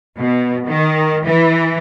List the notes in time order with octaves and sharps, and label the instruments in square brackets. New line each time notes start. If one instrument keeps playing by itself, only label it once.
[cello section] B2
D#3
E3